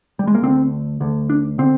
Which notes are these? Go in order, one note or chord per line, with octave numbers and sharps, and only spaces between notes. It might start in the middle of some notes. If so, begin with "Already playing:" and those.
G3
G#3
A#3
D2 D3 C4
D2 D3
D4
D3 C4